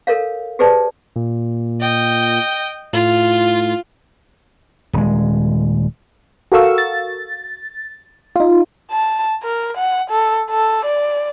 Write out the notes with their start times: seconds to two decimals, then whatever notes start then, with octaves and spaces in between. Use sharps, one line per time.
0.07 A4 A#4 C#5 F5
0.59 G4 G#4 B4 C5 D5 A5
1.16 A#2
1.80 D#5 G5
2.93 A2 F4
4.93 D#1 G#3
6.52 F#4 A4 A#4 F5 C#6 E6
6.78 A6
8.36 D#4 F4
8.91 A5
9.43 A#4
9.77 F#5
10.10 A4
10.50 A4
10.86 D5